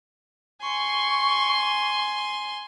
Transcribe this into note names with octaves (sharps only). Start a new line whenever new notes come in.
G#5 C6 C#6